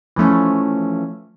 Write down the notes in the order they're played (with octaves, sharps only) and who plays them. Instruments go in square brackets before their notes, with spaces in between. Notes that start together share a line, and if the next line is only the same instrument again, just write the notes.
[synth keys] E3 F3 A3 C#4